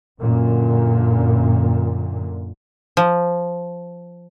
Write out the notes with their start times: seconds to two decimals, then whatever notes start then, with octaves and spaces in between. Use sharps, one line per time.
0.22 F#2 A#2 D3
2.97 F3